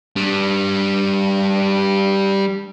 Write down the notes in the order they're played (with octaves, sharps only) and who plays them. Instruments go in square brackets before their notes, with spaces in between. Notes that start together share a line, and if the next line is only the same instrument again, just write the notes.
[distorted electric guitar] G3 D4